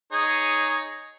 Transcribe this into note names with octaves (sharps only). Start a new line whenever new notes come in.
D#4 G#4 C#5